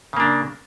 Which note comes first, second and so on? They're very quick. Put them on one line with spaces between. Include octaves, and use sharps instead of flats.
C#3 A#3 D4